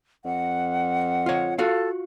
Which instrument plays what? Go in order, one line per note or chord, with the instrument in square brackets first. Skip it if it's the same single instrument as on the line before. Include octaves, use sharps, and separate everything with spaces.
[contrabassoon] F2 [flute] F#5
[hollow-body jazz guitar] F4 C#5
[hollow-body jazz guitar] F4 F#4 F5 [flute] A4